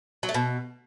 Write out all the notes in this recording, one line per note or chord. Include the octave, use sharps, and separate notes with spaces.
F#3
A3
B2